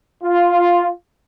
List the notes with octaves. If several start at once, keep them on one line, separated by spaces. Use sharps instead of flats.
F4